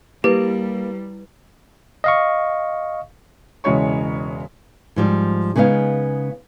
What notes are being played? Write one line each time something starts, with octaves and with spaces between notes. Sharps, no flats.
G3 A#3 E4 G4 B4
D#5 F5 C#6
E1 C#3 G#3 E4 C#5 C#6
G#2 F3 G3
C#3 G#3 B3 D#4 F5